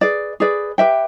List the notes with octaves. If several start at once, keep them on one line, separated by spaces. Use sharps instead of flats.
G#4 B4 D5
G#4 B4 D5
G4 B4 E5 G5